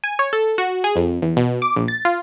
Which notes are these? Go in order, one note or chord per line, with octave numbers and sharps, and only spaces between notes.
G#5
C#5
A4
F#4
G#4
F2
E2
B2
D6
A#1
A6
F4